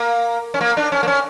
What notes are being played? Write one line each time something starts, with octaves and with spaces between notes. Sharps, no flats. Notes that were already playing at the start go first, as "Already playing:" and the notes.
Already playing: A#3
C#4
A#3
D4
C#4
A#3
C#4